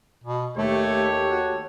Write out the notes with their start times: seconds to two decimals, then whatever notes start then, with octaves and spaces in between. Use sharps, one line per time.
0.24 B2
0.57 D#2 A3 G4 A4 C#5
1.31 F#4